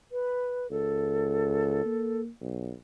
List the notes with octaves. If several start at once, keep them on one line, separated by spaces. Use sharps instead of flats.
B4
C#2 A4
A#3
B1